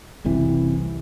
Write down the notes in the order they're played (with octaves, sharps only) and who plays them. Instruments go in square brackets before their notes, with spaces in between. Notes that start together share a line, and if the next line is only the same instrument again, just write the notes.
[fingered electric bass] F#1 C2 C3 E3